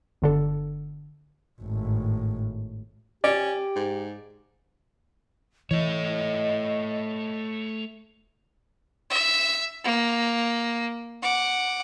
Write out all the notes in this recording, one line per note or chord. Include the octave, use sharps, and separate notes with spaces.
G1 D3 A4
G#1 A2
C#4 G4 D5
G#2
E3 A3 C#5 D#5
E5
A#3
F#5 D6